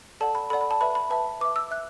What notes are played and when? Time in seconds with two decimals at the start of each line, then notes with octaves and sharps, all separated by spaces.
0.21 A4 D5 F#5 A5
0.35 B5
0.50 A4 B5
0.53 D5 F#5
0.61 B5
0.71 A5
0.81 B4 E5 B5
0.95 B5
1.10 B4 E5 A5
1.41 B4 D6
1.45 E5
1.56 E6
1.71 E5 F#6